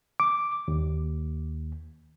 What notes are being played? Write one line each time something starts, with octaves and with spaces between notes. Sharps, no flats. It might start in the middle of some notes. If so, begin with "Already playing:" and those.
D6
D#2